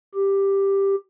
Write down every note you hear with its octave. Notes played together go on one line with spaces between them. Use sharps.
G4